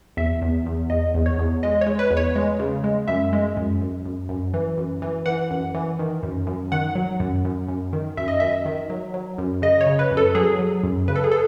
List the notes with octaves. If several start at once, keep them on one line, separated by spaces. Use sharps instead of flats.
E2 E5
E2
E2
E2 D#5
E2
C#5
E2
G#3 D#5
C#5
G#3
B4
E2
C#5
G#3
C#3
G#3
F#2 E5
G#3
F#2
F#2
F#2
F#2
E3
F#2
E3
E3 F#5
F#2
E3
D#3
F#2
F#2
D#3 F#5
F#3
F#2
F#2
F#2
D#3
F#2 E5
D#5
F#2 E5
D#3
F#3
F#3
F#2
C#3 D#5
C#5
C#3
B4
F#2
A4
F#3 G#4
F#3
F#2
C#3 B4
A4
G#4
A4